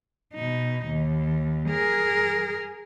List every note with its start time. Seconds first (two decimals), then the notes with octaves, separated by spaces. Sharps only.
0.34 B2 D#4
0.87 D#2
1.69 G#4 A#4